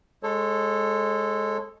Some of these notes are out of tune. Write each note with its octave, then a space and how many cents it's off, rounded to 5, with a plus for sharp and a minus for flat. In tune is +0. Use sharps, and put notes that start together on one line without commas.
G#3 +0 A4 +0 C#5 -35